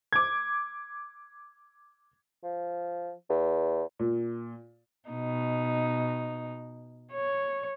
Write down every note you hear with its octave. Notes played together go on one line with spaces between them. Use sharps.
D6 G#6
F3
E2
A#2
B2 D#4
C#5